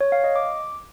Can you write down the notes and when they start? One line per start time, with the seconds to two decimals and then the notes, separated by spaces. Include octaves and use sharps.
0.01 C#5
0.12 F5
0.24 D#5
0.36 D6